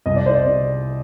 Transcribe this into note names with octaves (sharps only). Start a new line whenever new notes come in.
C2 D#5
D5
C5
D5
C3